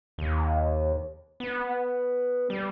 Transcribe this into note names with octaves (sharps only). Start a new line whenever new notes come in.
D#2
B3
G3